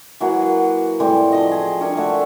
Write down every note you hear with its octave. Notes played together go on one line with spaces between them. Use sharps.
E3 F#3 A#3 F#5
A2 E3 G3 C4
F3 D#5
G#4
D4 G#4 A#4 C#6
A3 F#5